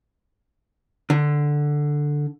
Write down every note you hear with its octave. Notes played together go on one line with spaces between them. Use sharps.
D3